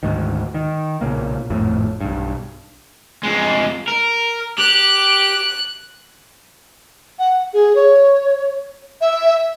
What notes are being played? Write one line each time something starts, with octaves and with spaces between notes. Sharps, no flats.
D2 G#2 D#3
D#3
B1 A#2 C#3 A#3
G#1 F2 A2
B1 G2
F2 G#3
A#4
G4 F#6
F#5
G#4
C#5
E5